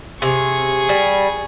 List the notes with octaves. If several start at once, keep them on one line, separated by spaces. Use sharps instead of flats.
C3 G#4 C#6
G3